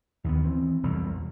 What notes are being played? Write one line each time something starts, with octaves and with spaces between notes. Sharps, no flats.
D#2 D#3 F#3 B3
E3 C4
E1 C2 F2 B2